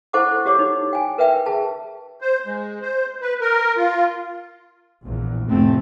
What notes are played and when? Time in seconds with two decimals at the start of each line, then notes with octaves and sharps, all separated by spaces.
0.13 E4 A4 C5 F#5 C#6 D6
0.46 F#4 G4 C#5 D6
0.59 D#4
0.93 G5 G#5
1.18 A#4 B4 E5 G5
1.46 G#4 A5
2.21 C5
2.46 G#3
2.82 C5
3.21 B4
3.41 A#4
3.77 F4
5.03 A#1 E2
5.48 F1 A2 A3 C4